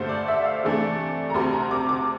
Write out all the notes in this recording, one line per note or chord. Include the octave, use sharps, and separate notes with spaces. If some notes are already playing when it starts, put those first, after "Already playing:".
Already playing: G2 D3 A3 C5
D5
E5
F5
C3 E3 A3 D4
A#5
D2 C3 G3 C6
A#5
D6
D6